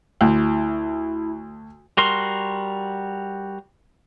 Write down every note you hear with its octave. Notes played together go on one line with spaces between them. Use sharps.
D2 E4
G3 F#4 A#4 C6